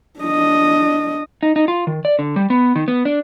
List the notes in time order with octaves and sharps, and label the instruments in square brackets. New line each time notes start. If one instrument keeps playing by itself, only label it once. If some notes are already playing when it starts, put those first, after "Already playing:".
[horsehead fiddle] D4 D#5
[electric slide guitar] D#4
D#4
F4
D#3
D5
D3
G3
B3
D#3
B3
D4